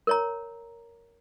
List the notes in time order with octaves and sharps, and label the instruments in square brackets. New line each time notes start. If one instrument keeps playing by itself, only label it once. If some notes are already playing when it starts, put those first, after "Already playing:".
[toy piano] A#4 C#5 A#5